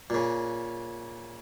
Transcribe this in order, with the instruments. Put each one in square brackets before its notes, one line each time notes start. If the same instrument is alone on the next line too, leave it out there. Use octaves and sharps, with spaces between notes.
[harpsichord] A#2 C#3